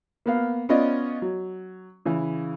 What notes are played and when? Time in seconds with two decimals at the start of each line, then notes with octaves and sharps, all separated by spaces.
0.26 A#3 B3 F5
0.69 B3 C#4 F4 D5 D#5
1.22 F#3
2.06 C#3 E3